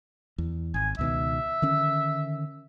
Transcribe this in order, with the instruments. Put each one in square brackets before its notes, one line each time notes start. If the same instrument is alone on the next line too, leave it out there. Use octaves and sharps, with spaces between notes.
[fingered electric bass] E2
[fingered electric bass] G#1 [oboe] G#5
[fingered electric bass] C#2 B2 D#3 [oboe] E5
[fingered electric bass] D3 D#3 C#4